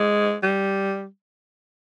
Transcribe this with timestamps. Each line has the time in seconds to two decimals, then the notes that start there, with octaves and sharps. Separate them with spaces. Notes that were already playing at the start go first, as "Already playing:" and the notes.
Already playing: G#3
0.43 G3